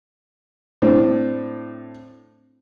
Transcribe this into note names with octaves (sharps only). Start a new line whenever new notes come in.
A2 C4 D4